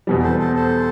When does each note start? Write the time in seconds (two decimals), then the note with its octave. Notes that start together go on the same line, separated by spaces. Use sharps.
0.07 E2 B2 G3
0.23 A4 C5
0.39 A4 C5
0.55 A4 C5